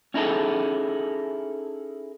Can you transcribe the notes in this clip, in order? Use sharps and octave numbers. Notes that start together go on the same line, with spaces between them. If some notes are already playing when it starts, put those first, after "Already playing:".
C#4 D#4 E4 G#4 A4